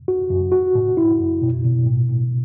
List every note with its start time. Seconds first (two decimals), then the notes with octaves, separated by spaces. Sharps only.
0.08 F#4
0.30 F#2
0.52 F#4
0.75 A2
0.97 E4
1.20 F#2
1.42 B2
1.65 B2
1.87 A2
2.09 A2